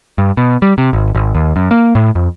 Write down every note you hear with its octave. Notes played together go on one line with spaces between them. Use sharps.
G2
B2
G3
C3
G#1
G#1
D#2
F#2
A#3
A2
F2